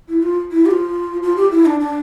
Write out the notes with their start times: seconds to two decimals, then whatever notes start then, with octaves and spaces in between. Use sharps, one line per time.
0.09 E4
0.23 F4
0.51 E4
0.66 G4
0.71 F4
1.23 F4
1.36 G4
1.51 E4
1.66 D4
1.80 D4